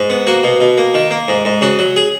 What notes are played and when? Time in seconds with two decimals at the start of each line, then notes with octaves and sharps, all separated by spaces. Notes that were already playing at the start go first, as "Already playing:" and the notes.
Already playing: G#2
0.10 B3
0.27 A#3 F#4
0.43 B2
0.60 B2
0.77 A#3
0.94 D#3
1.11 A#3
1.28 G#2
1.45 G#2
1.61 C#3 F#4
1.79 F#3
1.96 G#4